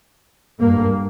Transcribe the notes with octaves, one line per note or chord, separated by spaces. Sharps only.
G2 A#3